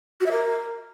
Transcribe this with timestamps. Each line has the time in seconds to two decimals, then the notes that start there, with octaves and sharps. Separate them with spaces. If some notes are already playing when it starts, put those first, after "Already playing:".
0.20 F#4
0.26 E5
0.31 A#4